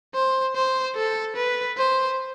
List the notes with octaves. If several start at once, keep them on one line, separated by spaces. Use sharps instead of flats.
C5
C5
A4
B4
C5